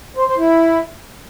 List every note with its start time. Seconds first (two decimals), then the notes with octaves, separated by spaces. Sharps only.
0.17 C5
0.27 C5
0.37 E4